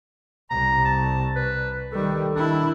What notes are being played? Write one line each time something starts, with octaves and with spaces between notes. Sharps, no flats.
C2 A#5
A5
B4
D#3 G3 A4
D#3 D4 E4